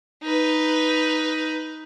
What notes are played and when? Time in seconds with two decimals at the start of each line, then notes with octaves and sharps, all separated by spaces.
0.23 D#4 B4